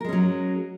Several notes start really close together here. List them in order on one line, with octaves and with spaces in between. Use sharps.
A#4 G#3 C#4 F#3